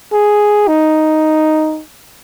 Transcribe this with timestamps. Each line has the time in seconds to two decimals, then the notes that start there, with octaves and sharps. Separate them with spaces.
0.13 G#4
0.68 D#4